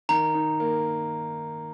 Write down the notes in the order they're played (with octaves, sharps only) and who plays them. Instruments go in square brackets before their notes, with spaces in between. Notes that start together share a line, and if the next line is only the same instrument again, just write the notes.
[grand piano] D#3 [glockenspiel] A#5
[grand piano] D#4
A#3